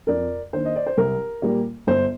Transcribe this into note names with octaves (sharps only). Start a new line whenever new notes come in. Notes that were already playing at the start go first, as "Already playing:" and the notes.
F2 A#4 D5
D#3 A#3 D4 C5
D#5
D5
C5
C2 A#4
A#2 G3 A#3
G1 C5